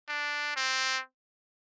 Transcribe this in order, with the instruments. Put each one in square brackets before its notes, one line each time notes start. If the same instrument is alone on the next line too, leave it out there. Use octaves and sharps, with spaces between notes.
[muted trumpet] D4
C4